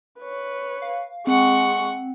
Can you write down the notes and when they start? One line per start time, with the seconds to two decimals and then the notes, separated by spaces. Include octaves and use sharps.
0.20 B4 C#5
0.82 F5
1.27 G#3 C4 F#5 C#6